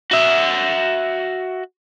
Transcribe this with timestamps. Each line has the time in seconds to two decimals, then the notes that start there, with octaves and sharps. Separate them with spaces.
0.11 F#4 E5